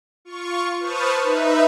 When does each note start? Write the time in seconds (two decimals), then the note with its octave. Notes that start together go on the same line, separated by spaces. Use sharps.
0.25 F4 C#6
0.80 B4 C5 A5 C#6 D#6 F6
1.23 D#4 B4 E5